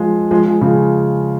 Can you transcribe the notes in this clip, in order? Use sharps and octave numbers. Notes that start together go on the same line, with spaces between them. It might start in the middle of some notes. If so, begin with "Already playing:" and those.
Already playing: F3 G#3
F3 G#3
F3 G#3
C#3 F3